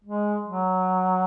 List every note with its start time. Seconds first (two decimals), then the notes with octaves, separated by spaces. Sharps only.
0.04 G#3
0.48 F#3